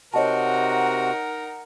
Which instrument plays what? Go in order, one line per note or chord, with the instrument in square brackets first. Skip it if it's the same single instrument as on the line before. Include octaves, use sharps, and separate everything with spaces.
[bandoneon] C3 F#4 [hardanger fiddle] D#4 A#4 [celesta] C#5 D#5 A5 [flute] F#5